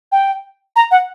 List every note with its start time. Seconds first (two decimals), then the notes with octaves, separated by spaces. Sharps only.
0.12 G5
0.76 A#5
0.91 F#5